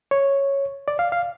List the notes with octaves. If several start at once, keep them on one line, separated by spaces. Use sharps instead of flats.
C#5
D5
F5
F5